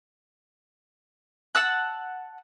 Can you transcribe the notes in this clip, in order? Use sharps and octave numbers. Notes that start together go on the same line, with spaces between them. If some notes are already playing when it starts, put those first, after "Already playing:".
F#5 A5 E6 F#6